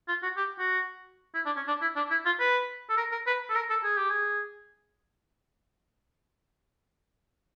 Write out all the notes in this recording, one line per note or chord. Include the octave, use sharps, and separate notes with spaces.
F4
F#4
G4
F#4
E4
D4
C#4
D4
E4
D4
E4
F4
B4
A4
A#4
A#4
B4
A4
A#4
A4
G#4
G4
G#4